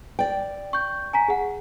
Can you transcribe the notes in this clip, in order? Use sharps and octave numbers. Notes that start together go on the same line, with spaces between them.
D5 G5
C#6 G6
G#5 A#5 B6
G#4 F#5